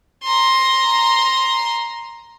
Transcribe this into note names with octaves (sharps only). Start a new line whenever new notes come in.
A#5 C6